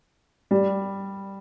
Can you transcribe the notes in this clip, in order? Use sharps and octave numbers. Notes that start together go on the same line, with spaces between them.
G3